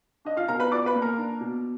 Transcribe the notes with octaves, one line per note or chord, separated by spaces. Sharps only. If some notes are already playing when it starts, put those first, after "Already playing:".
D4 D#5
F4 F5
B2 A#4 A#5
B4 B5
F4 D5 D6
B4 B5
A#3
A#4 A#5
D4
B2